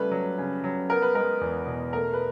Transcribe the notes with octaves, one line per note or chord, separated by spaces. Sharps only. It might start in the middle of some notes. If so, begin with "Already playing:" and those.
Already playing: C#3 G3 A3 B4
F#3
C#3
F#3
B3 A#4
B4
G#3 A#4
E2
B2
A3 A#4
B4